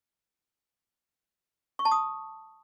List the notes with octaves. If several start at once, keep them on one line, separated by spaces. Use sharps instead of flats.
C#6
A5
D#6